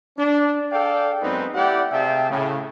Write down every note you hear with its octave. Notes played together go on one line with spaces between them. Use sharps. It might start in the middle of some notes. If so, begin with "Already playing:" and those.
D4
G#4 A4 D5 F5 G5
F#2 G#3 B3 C4 D#4 B4
A3 E4 G4 D5 F#5 G5
C3 G#4 E5 F5 G5 A5
A2 C#3